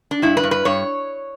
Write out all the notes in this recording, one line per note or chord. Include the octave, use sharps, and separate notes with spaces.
D4
G2 E4
B4
G2
B4
G2 C#5